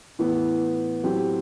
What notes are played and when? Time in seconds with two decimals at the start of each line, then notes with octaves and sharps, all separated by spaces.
0.19 A2 E3 B3
1.04 A2 F#3 C4 G4